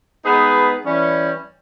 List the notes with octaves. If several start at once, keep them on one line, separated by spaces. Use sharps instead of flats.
G#3 B3 D#4 G#4 B4
E3 G3 C#4